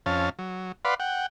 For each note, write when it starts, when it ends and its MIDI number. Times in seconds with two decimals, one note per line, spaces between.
0.06 0.29 41
0.06 0.29 61
0.06 0.29 77
0.06 0.29 81
0.39 0.72 54
0.85 0.94 71
0.85 0.94 74
0.85 0.94 77
0.85 0.94 78
0.85 0.94 83
0.85 0.94 84
1.00 1.26 78
1.00 1.26 79